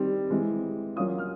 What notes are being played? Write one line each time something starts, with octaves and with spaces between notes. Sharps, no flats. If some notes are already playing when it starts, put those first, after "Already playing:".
Already playing: D#3 G3 C4
E3 G#3 C4
F#3 A#3 C#4 F4 D#6
F6